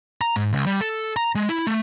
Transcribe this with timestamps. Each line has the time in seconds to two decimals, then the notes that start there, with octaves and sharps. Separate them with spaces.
0.21 A#5
0.36 G#2
0.53 C#2
0.66 G3
0.81 A4
1.16 A#5
1.35 G#3
1.49 E4
1.67 A3